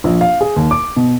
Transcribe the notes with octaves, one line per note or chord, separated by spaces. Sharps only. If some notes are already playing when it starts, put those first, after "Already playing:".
A#1
F5
G#4
D#2
D6
B2